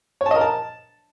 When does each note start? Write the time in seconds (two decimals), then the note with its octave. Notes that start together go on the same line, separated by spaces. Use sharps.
0.21 C#5
0.26 A5
0.31 D#5
0.36 A#4
0.41 A5